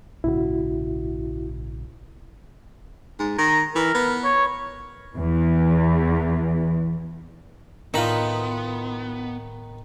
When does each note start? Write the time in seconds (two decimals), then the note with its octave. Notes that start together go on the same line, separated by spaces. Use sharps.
0.24 A#1 G#2 C#3 E4 F#4
3.20 G#2
3.38 D#3 A#5
3.76 E3 A#4
3.95 B3
4.24 C#5
5.15 E2 E3
7.94 A2 D#3 B3 D#4 F4 A5 B5 A#6